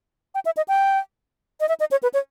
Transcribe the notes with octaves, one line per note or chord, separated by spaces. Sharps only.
G5
E5
D#5
G5
D#5
E5
D#5
C#5
B4
C#5